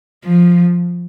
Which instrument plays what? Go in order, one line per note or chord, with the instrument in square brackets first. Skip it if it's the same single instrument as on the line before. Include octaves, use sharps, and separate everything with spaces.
[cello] F3